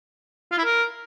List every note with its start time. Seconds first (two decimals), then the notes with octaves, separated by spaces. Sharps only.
0.52 F4
0.58 E4
0.64 A#4